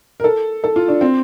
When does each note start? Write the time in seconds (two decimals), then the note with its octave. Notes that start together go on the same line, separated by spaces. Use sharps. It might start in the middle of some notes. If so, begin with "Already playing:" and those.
0.20 A#4
0.24 A4
0.64 A4
0.76 F4
0.88 D4
1.01 C4